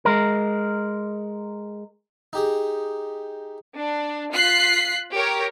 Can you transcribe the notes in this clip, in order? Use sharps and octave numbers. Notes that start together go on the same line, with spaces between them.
G#3 A#4
D#4 G4 G#4
D4
F4 F#6 B6 C7
G4 A#4 C#5